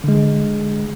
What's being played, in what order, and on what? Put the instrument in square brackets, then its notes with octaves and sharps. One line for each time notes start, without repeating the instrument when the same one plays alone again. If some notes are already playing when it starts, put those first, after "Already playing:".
[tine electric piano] D3 G#3